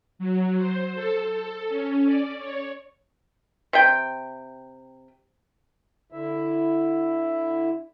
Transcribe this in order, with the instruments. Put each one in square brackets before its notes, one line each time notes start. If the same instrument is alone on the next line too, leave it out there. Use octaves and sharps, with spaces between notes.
[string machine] F#3
C5
A4
A4
C#4
D5
C#5
[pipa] C3 G5
[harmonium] D3 E4 E5